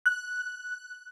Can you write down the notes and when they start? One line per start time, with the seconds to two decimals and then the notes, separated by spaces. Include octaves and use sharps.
0.06 F#6